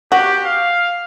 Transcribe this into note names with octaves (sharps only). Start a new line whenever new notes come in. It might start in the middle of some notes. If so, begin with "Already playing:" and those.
F#4 G4
F5